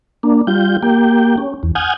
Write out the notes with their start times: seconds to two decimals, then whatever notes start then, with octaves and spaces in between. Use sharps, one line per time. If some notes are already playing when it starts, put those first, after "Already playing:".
0.23 A#3 D4
0.47 G3 F4 G6
0.83 A#3 G4 G5
1.38 C#4
1.63 E2
1.75 F#5 G#5 D#6 F6 G6 G#6